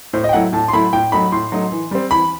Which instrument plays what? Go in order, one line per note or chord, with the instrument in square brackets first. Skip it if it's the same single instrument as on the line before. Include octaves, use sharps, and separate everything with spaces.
[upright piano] A2 [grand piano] C5
[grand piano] D#5
G5
[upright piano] F#3 A3 E4 [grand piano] F#5
[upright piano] A2 [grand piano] A5
[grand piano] C6
[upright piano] F#3 A3 E4 [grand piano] B5
[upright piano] A2 [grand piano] G5
[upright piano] F#3 A3 D#4 [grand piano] B5
[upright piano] A2 [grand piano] C6
[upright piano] F#3 A3 D#4
E3
G3 C4
[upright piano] E3 [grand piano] B5